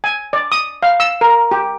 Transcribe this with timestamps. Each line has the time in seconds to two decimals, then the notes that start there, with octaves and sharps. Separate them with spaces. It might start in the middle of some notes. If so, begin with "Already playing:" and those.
0.04 G#5
0.33 D5
0.52 D#6
0.83 F5
1.00 E6
1.21 A#4
1.51 G4